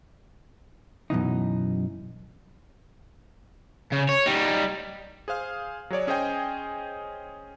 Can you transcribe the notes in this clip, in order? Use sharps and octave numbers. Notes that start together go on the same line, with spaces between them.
F#2 B2 E3 D#4
C#3
C#5
G3 D#4
G#4 C5 F5 F6
F#3 G#4 C#5 D5
C#4 G#4 C5 D#5 G5 G#5